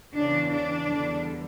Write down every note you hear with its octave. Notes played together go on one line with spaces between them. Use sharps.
E2 C#3 E3 D4
D4
E2 D3 G3